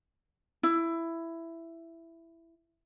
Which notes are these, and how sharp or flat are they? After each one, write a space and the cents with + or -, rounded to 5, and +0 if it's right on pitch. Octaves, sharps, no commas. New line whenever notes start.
E4 +10